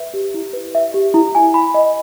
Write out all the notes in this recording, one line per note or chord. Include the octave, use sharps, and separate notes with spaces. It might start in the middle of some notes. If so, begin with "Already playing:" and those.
Already playing: B4 E5
G4
E4
B4
E5
G4
E4
G#5
B5
D#5